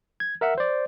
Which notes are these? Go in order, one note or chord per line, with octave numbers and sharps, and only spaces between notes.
G#6
A#4 E5 F#5 E6
C5 D5